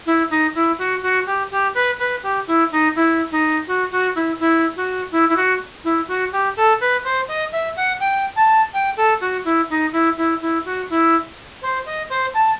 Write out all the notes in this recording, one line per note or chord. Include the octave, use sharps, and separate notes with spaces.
E4
D#4
E4
F#4
F#4
G4
G4
B4
B4
G4
E4
D#4
E4
D#4
F#4
F#4
E4
E4
F#4
E4
E4
F#4
E4
F#4
G4
A4
B4
C5
D#5
E5
F#5
G5
A5
G5
A4
F#4
E4
D#4
E4
E4
E4
F#4
E4
C5
D#5
C5
A5